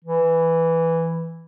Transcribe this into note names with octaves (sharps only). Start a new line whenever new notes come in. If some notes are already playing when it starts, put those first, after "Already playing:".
E3